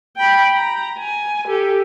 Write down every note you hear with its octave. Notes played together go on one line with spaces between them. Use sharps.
G5 B5
A#5
G#5
G4 A4